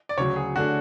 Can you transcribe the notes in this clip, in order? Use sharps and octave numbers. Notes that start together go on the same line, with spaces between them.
D5
D2 C#3 F#3 C#5
G#4
D3 A3 D4 F#4 A4